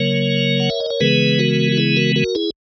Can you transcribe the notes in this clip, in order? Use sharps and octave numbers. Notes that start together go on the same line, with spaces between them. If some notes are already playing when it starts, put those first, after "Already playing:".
Already playing: C#3 F#3 A#3 A#4 C#5
F#5
E5
D#5
C#5
C#3 E3 G#3 B3 G#4 B4
F#4 A#4
F#4
E4 G#4
F#4 A#4
F#4 A#4
E4 G#4